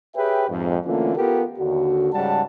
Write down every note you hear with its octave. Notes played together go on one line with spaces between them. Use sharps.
G4 G#4 B4 C#5 E5 G5
F2 G#2
D3 E3 A3 A#3 C#4 F4
B3 F4 G4 A4 A#4
D#2 D3 F#4
G#2 C#3 G3 F#5 A5